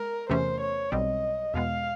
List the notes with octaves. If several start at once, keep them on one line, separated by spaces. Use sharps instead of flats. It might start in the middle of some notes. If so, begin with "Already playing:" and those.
Already playing: G#3 A#4
E2 C3 E3 A3 C#4 C5
C#5
B1 B2 G3 C4 D#5
E2 B2 G#3 B3 F5